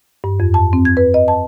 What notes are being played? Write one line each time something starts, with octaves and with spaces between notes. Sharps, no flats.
G2
F2
A5
C4
G#6
B4
D#5
A5